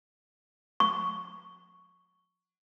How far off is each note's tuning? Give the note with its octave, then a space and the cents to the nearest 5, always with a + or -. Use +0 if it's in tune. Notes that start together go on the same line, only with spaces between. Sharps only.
C#6 +5